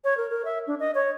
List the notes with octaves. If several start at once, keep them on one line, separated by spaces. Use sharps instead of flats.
C#5
A#4
A#4
E5
D4
D#5
C#5